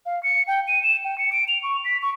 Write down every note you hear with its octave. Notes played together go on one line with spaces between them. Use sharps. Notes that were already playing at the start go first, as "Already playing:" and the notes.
F5
C#7
G5
D#7
E7
G5
C#7
D7
F7
C#6
B6
C#6